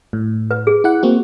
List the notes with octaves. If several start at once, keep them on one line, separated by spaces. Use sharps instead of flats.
A2
B4
G#4
E4 F#5
A#3 C4 F#4